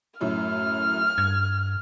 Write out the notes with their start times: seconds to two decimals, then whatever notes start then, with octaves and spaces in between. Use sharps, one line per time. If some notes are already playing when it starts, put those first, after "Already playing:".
0.21 F#2 A2 F6
1.18 G2 G#6